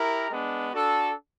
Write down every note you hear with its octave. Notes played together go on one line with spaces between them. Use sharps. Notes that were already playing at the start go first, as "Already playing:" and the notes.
Already playing: E4 G4 A#4
G#3 B3 D4
D4 F#4 A4